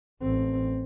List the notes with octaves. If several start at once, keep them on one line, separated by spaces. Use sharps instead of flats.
A1 C4